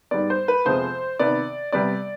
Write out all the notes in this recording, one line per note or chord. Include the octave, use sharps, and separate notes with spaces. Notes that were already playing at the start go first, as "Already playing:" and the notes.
G#2 G3 B3 D5
C5
B4
F2 C3 F3 G#3 B3 C5
C3 D#3 B3 D5
C3 G3 B3 D5